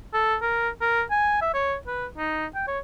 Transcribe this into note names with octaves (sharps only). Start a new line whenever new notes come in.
A4
A#4
A#4
G#5
E5
C#5
B4
D#4
G5
C#5